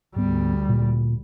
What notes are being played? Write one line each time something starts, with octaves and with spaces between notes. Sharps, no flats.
D2 G#2 G3 B3
A#2